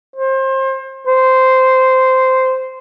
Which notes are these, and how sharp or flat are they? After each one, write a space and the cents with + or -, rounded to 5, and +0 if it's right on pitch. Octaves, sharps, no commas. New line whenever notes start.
C5 +30
C5 -10